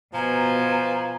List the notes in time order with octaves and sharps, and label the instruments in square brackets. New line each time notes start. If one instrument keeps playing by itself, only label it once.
[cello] B2 [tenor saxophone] F3 [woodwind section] G#5 [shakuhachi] A#5